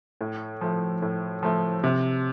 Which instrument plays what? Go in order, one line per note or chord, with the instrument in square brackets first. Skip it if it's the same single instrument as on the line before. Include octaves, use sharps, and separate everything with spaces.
[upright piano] A2
F3 A3
A2
F3 A3
C3